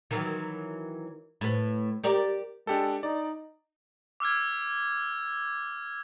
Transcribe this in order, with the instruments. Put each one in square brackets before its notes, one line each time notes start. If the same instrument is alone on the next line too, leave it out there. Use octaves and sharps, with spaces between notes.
[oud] D#3 E3 F#3
A2 B4
G4 A#4 D5
[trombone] G#3 [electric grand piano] D4 G4 A4
[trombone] D#4 [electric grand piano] D5
[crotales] D6 E6 F6 G#6